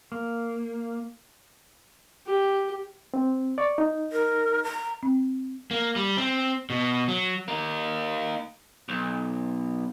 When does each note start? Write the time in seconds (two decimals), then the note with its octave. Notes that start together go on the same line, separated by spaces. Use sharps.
0.12 A#3
2.27 G4
3.14 C4
3.58 D5 C#6
3.78 D#4
4.12 A#4
4.64 A#5
5.03 C4
5.71 A#3
5.96 G3
6.17 C4
6.70 B2
7.08 F#3
7.48 A#3 D#4
8.89 B1